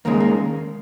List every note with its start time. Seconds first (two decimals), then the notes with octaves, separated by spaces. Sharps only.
0.05 D#2 C#3 G#3 A#3
0.20 A#3